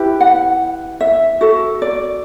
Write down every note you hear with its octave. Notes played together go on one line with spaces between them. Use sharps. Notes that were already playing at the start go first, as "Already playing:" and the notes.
Already playing: E4 G4 B4
F#5
E5
F#4 A4
D5